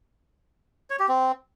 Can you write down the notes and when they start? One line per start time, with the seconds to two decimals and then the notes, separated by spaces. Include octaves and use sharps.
0.90 C#5
0.99 G4
1.09 C4